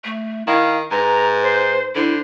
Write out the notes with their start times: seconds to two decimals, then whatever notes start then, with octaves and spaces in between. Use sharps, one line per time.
0.05 A3
0.47 D#3 E4 F5
0.91 G#2 B4 A#5
1.43 C5
1.95 D3 E4 C5